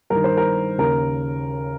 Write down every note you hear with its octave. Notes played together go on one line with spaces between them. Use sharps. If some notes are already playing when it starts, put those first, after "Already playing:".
G2 D#3 A#4
C5
A#4
D#2 C#3 A#4